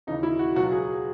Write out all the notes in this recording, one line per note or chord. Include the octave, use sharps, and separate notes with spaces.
D#2 C#3 E3 D#4
E4
F#4
C#2 B2 F#3 F#4
G#4